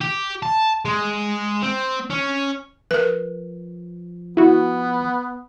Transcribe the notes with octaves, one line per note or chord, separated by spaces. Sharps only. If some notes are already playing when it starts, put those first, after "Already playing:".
G4
A5
G#3
C4
C#4
F3 A#4 B4
B3 E4 F#4